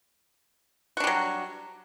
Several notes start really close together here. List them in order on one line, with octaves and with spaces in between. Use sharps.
F#4 D4 G3 F#3